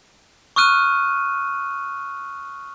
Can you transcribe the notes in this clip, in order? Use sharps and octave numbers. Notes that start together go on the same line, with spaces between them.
C#6 D#6 F6 F#6 D#7